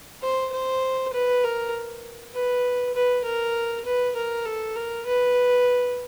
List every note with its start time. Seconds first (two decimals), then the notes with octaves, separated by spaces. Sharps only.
0.22 C5
0.52 C5
1.13 B4
1.44 A#4
2.34 B4
2.94 B4
3.24 A#4
3.85 B4
4.16 A#4
4.45 A4
4.76 A#4
5.06 B4